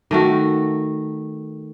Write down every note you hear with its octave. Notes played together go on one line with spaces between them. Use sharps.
D#3 A3 F#4